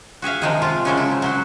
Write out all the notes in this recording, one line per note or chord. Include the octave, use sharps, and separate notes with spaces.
F#4 G#4 E5 F5
C3 D#3 F3 G#3 D#4 G#4
C3 F4
C#3 F3 F#3 G#3 A#3 C#4
E4
F#3 F#4 C5